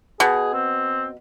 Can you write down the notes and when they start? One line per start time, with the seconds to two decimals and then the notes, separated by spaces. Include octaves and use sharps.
0.20 B2 G#4
0.53 C4